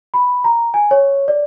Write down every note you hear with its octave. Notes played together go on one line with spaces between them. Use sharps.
B5
A#5
G#5
C#5
D5